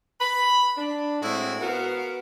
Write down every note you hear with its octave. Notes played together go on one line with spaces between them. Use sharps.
B5
D4
A2 G#3 C4 E4 F#4
B3 F#4 A#4 B4 F5